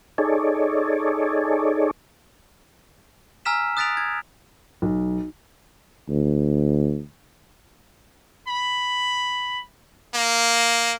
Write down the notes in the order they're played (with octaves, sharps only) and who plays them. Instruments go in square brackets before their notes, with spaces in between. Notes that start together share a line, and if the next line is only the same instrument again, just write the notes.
[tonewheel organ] D#4 G#4 A4 C#5 D5
[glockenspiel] G#5 A#5 E6 F6 B6 E7
D#6 F#6 A6 B6 D7 F7
G#6
[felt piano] B1
[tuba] D2
[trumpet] B5
A#3